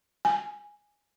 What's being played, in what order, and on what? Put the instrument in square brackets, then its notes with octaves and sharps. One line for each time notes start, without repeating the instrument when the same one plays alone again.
[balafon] G#5